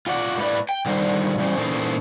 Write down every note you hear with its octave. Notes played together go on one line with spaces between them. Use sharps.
F4 F#4 D5 F#5
A2 A3 B4 D5
G5
D3 D#3 G3 C5
E3 G3 C#4 C5
A#2 E3 C#4 D#4 A4 C5